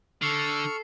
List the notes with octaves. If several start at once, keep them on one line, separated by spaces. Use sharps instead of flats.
D3 A4 C#6 E6 F6 C7